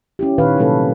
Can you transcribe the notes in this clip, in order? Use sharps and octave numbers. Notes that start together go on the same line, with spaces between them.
C#4 E4 G4
A#2 D#3 B4 C#5 F5
C3 F#3 G3 A#3 A4 B4